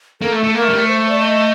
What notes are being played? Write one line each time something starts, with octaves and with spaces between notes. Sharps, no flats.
A#3 A4
A3
A3
A#3 A#4
A3
G3
A3
C5
D5
D#5